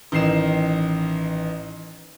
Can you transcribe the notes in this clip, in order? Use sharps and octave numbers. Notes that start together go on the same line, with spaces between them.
A1 D#3 C7 E7